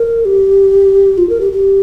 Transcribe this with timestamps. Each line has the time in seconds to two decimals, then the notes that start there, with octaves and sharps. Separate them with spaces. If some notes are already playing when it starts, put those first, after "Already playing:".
Already playing: A#4
0.25 G4
1.18 F4
1.29 A#4
1.41 G4
1.52 G4